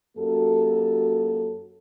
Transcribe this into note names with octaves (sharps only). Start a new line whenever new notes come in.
F#2 A#3 F#4 G4 A4